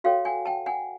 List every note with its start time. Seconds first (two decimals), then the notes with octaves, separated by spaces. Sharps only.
0.04 F#4 A4 C#5 F5 G5
0.25 F#5 G#5
0.46 G5 A5
0.66 F#5 G#5